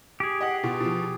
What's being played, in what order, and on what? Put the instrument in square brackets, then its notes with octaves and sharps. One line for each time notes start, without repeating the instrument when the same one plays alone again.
[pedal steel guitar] G4 G#4
[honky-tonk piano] D#5 F#5
B2 F4
B2 F3